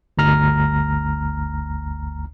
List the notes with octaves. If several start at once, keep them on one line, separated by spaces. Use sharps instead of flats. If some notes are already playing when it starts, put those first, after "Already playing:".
G1 D2 A#5 F6 A#6